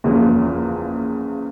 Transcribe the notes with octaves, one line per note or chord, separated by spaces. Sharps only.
F#1 E2 C#3 F3 A#3